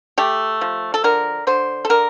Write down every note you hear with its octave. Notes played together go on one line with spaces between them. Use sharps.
A3 G4
F3
A4
D3 A#4
D3 C5
A4
D3 A#4